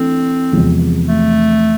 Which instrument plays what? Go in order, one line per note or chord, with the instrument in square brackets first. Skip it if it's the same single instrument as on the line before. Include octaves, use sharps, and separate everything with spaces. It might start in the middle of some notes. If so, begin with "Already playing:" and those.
Already playing: [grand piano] E3 A3 D4 [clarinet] C4
[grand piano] E2 C3 F3 G#3 B3
[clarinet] A3